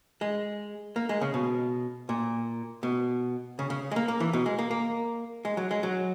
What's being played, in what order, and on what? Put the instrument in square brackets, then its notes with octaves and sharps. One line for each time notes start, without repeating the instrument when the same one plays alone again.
[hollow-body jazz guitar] G#3
A#3
G#3
C#3
B2
A#2
B2
C#3
C#3
G#3
A#3
A#3
E3
B2
G#3
A#3
A#3
G#3
F#3
G#3
F#3